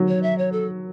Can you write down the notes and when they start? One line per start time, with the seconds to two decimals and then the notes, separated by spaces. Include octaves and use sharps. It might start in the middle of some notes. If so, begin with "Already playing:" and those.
Already playing: F#3
0.08 C#5
0.23 E5
0.38 C#5
0.52 A4